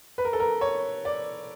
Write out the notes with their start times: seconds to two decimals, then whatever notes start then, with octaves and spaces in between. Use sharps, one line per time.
0.18 B4
0.25 A#4
0.33 A4
0.40 A#4
0.61 C#5
1.05 D5